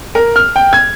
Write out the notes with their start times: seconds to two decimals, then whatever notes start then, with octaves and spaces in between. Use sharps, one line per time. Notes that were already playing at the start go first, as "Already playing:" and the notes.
0.15 A#4
0.36 F6
0.56 G5
0.73 G#6